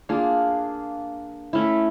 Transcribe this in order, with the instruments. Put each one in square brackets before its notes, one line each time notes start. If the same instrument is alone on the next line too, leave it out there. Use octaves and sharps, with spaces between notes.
[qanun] A#3 D4 F4 G#4
A3 C#4 E4